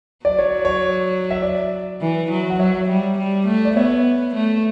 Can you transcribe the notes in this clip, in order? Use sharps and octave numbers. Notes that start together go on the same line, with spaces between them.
F#3 D5
C#5
C#5
E5
D5
E3
F#3
F#5
F#3 C#5 E5
G3
G3
A3
D5
B3 C#5 E5
A3